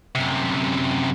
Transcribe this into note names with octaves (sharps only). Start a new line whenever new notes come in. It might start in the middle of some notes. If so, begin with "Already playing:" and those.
F#2 C3